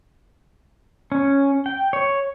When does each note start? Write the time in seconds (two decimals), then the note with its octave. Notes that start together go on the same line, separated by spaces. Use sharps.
1.12 C#4
1.66 G5
1.93 C#5